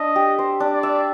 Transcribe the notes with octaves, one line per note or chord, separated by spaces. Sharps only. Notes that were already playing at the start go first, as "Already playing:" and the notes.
Already playing: D4 D#5 E5
G4
C5
D4
D5
E5